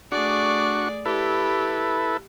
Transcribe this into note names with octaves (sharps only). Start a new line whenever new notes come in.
A3 D4 F#4 G#4 D5 C#6
E4 G4 A4 B4